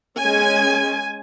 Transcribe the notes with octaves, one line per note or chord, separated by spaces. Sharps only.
G#3 C#4 G#5